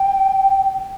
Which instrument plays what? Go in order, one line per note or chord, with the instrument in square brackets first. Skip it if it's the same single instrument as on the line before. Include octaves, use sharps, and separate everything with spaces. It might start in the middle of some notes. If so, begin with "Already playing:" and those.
Already playing: [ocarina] G5